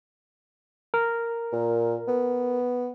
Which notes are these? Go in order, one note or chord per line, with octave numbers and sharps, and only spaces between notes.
A#4
A#2
B3